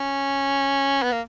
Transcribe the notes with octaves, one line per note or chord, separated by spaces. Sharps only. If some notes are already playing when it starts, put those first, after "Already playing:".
Already playing: C#4
B3
A#3